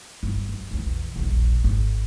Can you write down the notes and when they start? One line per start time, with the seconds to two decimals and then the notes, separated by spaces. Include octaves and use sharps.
0.23 G1
0.49 F#2
0.71 A#1 E2
1.16 D#1 A#1
1.64 G#1